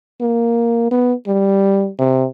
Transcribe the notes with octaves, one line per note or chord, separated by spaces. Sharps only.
A#3
B3
G3
C3